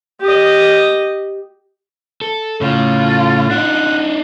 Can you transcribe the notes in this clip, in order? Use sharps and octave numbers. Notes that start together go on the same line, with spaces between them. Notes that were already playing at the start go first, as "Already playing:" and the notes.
G4 D#5
A4
A2 C#3 F4
D4 D#4 F#5